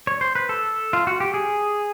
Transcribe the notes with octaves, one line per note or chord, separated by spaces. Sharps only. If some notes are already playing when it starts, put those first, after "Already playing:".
C#5
C5
B4
A4
F4
F#4
G4
G#4